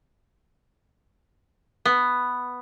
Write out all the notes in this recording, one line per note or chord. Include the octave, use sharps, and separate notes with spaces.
B3